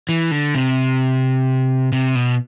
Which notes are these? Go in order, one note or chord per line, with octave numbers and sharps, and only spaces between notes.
E3
D3
C3
C3
B2